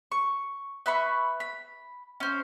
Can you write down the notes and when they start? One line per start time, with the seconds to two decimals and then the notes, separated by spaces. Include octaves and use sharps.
0.12 C#6
0.86 B4 E5 B5 C#6
1.40 B5
2.20 C#4 C5